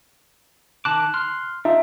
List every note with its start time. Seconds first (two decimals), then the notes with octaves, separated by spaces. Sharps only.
0.85 D#3 A5 D6 F#6
1.14 C6 F6
1.65 D4 D#4 F4 E5